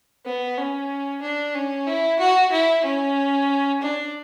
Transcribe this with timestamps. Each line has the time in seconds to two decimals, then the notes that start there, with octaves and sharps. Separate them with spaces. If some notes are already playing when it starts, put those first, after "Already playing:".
0.26 B3
0.58 C#4
1.22 D4
1.55 C#4
1.87 E4
2.19 F#4
2.52 E4
2.84 C#4
3.81 D4